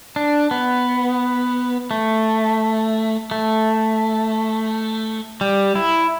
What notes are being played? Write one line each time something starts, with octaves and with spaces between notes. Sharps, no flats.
D4
B3
A3
A3
G3
E4